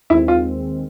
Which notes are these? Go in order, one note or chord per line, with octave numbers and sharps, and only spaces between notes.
D#2 D#3 G#3 C4 E4
F4